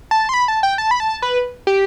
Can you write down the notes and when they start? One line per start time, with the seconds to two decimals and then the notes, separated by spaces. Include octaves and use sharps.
0.11 A5
0.29 C6
0.34 B5
0.48 A5
0.63 G5
0.78 A5
0.91 B5
1.00 A5
1.22 B4
1.67 G4